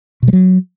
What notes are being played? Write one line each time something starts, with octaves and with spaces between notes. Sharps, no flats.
B2
G3
F#3